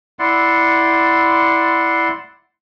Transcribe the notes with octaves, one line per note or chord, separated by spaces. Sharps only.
E4 D5 F#5 C6